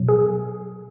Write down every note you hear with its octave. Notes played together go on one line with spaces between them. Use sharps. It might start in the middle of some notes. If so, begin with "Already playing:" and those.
Already playing: B2 F#3
G#4